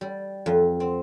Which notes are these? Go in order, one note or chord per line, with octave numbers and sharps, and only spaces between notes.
G3
F2
C4